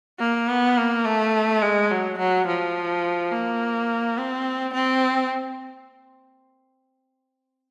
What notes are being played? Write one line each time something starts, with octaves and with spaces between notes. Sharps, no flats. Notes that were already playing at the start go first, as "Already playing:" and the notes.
A#3
B3
A#3
A3
G#3
F#3
F#3
F3
A#3
C4
C4